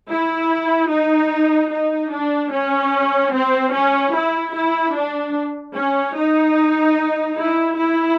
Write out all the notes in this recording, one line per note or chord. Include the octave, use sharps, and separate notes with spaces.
E4
D#4
D#4
D4
C#4
C4
C#4
E4
E4
D4
C#4
D#4
E4
E4